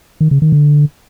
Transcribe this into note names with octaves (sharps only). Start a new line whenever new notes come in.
D#3
C#3
D#3
D3